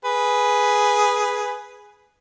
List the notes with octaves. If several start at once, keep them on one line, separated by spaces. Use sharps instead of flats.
G#4 B4